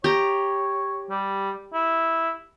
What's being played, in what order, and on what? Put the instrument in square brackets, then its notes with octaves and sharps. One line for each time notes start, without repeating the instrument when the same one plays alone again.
[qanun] G4 A#5 [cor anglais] C#5
[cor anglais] G3
E4